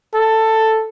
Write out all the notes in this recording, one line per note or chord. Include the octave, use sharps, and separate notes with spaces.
A4